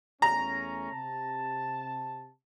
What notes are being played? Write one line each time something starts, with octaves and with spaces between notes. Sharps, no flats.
E2 A3 C#4 A#5
C3 A5